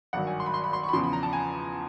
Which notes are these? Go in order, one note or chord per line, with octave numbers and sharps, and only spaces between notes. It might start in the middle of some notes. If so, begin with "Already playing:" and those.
G#1 G2 D#3 F#3 F#5
G#5
C6
B5
C6
B5
C6
C#6
B5
E2 C#3 F3 C6
B5
A#5
A5
G#5